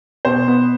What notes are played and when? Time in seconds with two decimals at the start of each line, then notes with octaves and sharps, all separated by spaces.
0.25 B2 C5
0.48 B3